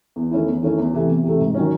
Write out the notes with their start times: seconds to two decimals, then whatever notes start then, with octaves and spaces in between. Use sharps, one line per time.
0.16 E2
0.31 D#3 A3 C#4 E4
0.46 E2
0.63 D#3 A3 C#4 E4
0.78 E2
0.93 C3 E3 A3
1.09 E2
1.24 C3 E3 A3
1.40 G#2
1.55 D#3 F#3 C#4